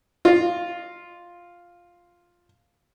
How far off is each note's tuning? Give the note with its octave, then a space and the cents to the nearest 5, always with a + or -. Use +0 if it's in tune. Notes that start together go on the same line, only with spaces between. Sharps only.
F4 +0 D#5 -35